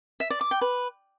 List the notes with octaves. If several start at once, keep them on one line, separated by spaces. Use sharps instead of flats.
E5
D5
D6
G5
B4